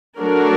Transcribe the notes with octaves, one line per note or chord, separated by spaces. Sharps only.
F#3 A3 D4 F#4 A#4